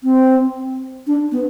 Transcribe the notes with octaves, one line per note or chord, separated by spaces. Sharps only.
C4
D4
B3